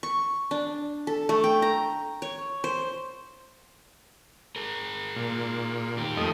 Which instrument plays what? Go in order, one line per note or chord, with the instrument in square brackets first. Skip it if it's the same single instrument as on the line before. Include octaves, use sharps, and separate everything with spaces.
[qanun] C#6
D4
A4
A3
G5
A#5
C#5
C5
[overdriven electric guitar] G#4 A#4
[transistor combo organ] A#2
[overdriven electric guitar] D#3 G4
[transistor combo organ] F2 A3 D#5